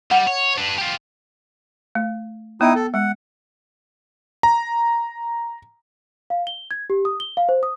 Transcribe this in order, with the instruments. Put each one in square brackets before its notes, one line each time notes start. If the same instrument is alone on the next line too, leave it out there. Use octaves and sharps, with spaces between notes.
[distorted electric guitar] G3 [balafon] F#5
[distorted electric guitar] C#5
D4 B4
F4 G4
[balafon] A3
[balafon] B3 G5 [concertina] D#4 E4 D#6
[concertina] A4
[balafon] G#3 [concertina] F#5
[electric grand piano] A#5
[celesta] F5
G7
G#6
G4
D#6
G7
F5
C5
D#6